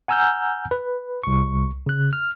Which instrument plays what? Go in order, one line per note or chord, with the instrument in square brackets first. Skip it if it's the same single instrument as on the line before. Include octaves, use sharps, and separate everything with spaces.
[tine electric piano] F#5 G#5 A#5 E6 F6 G6
B4
C2 C#6
C#3 F#6
F6